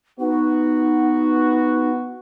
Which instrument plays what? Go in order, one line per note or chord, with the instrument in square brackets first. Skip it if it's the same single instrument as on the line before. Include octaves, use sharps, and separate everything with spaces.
[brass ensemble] B3 F#4 [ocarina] D#4